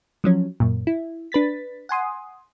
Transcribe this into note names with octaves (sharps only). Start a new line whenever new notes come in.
F3 F#3 C#4
F#2 A#2
E4
D4 B4 A6 B6
F#5 G#5 C6 D#6